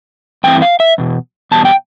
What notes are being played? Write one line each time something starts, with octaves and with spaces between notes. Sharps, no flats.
G2 E3 A3 C4 E4 G5
F5
E5
E2 B2
E2 B2 G3 A5
G5